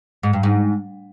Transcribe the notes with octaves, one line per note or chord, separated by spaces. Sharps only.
G#2
G2
G#2